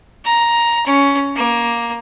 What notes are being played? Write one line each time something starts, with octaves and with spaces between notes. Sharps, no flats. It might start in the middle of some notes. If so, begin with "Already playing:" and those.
A#5
C#4
A#3